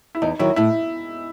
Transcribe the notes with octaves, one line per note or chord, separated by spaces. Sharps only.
E4
E2 D#4
D#3 F#3 E4
A2 E4